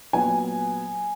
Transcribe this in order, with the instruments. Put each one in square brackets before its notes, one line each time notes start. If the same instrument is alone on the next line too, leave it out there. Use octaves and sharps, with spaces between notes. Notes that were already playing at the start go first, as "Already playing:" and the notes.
[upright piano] A#2 F#3 B3 G#5